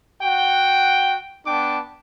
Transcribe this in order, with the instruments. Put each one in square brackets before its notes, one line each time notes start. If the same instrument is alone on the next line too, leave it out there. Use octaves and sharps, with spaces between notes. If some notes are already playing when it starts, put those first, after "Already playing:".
[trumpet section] F#4 F#5 G5
B3 D4 G5 A5 D6